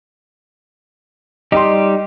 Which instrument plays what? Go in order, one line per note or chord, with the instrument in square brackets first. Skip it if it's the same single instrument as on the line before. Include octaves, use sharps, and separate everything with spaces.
[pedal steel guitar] G3 D#4 G4 [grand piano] D#5 C6